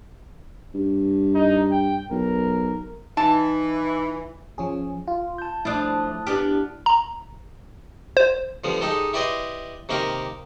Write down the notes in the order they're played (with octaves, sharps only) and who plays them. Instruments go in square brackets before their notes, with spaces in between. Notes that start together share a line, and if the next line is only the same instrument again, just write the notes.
[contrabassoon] G2
[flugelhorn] D#4
G5
[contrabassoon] B1 [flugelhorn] A#4
[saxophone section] E3 [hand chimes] D#4 [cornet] B4 [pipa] A5
[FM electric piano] F3 C#4 G#4
F4
[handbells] A5 G6
[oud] F3 D4 [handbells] A3 D#6 F#6 [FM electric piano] E4 A5
[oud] B3 D4 G4 [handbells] F6
[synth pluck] A#5
C5
[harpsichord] D3 F3 G3 B3
G#3 D#4 G4 A4
E4 G4 B4 D5 D#5 C6
C3 D#3 A#3 G4 A#4